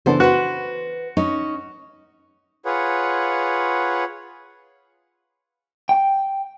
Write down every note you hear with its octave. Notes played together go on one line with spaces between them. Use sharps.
C#3 E3 B3 D4 A4 C5
F#4 B4 C5
C#4 D#4
F4 G#4 B4 C#5 F#5
G5